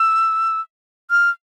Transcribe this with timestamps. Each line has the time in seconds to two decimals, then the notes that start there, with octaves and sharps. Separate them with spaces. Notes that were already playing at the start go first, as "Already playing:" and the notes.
Already playing: E6
1.10 F6